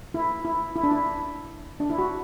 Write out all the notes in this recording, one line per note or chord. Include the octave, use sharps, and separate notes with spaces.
E4
E4
E4
D4
E4
D4
E4
F#4